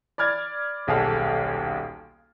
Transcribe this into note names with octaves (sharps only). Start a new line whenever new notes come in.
D5 B5 F6 G#6 A6
D#1 B1 G#4 A4 F5